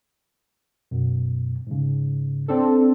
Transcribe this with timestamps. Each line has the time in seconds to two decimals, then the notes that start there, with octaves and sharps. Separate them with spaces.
0.91 F#2 B2
1.67 G#2 C#3
2.48 C4 D4 A4